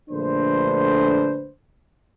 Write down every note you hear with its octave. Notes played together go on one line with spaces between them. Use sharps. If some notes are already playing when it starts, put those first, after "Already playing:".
A#1 D3 A3 D4 B4 C5